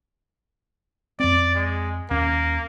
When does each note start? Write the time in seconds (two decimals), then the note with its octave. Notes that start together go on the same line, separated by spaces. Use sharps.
1.20 F2 C4 D5
1.55 G#3
2.11 D#2 A#3 C#4